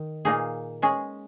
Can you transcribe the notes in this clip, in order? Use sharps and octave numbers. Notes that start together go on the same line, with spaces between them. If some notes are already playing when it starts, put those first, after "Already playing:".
Already playing: D#3
A#2 A#3 D#4 G#4
G#3 C#4 G#4